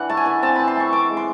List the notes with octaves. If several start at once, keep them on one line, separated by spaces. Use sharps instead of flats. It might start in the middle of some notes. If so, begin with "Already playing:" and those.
Already playing: E3 D4 F#5
A3 A5
G#5
E3
C4 A5
E3 B5
C6
A3 C#6
E3 D6
G#3
C6